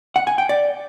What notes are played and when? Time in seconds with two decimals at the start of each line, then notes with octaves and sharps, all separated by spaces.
0.16 F#5
0.27 G#5
0.38 G5
0.49 D5